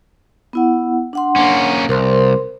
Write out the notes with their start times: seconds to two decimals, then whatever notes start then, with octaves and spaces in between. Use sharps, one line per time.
0.53 B3 E4 F#5
1.13 D4 F#5 C6
1.36 A#3 C#4
1.89 C2 A#4 C5 C6